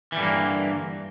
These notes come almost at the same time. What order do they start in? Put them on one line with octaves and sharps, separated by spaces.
E3 G3 D3 G2 A#3